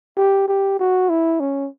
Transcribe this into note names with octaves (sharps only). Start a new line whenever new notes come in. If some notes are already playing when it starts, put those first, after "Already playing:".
G4
G4
F#4
E4
C#4